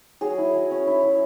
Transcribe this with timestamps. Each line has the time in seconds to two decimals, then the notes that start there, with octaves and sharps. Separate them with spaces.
0.21 F#3 G#4
0.38 E4
0.54 F#3
0.71 C#4
0.87 E4
1.03 F#3